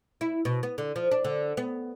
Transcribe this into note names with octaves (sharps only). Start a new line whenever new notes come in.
E4
B2
B3
D3
F3
D4
D3
B3